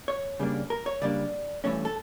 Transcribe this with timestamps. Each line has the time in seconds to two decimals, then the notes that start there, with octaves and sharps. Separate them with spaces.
0.08 C#5
0.39 C#3 G3 A#3 D4
0.70 A#4
0.86 C#5
1.01 C#3 G3 A#3 D4 D5
1.64 G2 E3 A3 C#4 C#5
1.85 A4